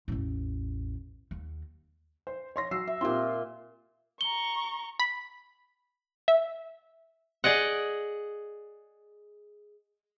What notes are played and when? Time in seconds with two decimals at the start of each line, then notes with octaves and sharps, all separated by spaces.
0.08 A1 E2
1.31 D#2
2.27 C5
2.56 C#5 C6 A#6
2.71 F#3 E6 C7
2.87 E5
3.01 A#2 C4 F4 G4 C6
4.21 A#5 C#6 G7
4.99 B5
6.28 E5
7.44 G#4 D5 D#5 F#5